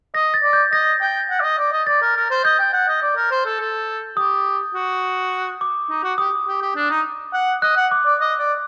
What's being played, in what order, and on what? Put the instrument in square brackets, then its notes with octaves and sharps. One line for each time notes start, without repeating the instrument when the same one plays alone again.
[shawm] D#5 [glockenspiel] A#6
[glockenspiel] A6
[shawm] D5
[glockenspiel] G6
[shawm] D#5 [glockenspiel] A#6
[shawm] G5
F#5
D5
D#5
D5
D#5
[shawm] D5 [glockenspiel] A6
[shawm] A#4
A#4
C5
[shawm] D#5 [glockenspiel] G6
[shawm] G5
F#5
D#5
D5
A#4
C5
A4
A4
[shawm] G4 [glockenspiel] D#6
[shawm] F#4
[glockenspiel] D6
[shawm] D#4
F#4
[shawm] G4 [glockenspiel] D#6
[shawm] G4
G4
D4
D#4
F#5
[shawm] D#5 [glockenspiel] F#6
[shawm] F#5
[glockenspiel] D6
[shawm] D5
D#5
D5